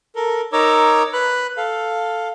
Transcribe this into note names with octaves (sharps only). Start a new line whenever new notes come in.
A4 A#4
D#4 A#4 C#5 A#5 D6 E6
B4 B5 F#6
A4 F5